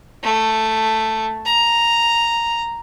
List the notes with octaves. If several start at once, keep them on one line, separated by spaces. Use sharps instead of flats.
A3
A#5